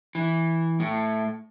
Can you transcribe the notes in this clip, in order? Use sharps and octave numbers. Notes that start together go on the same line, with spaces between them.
E3
A2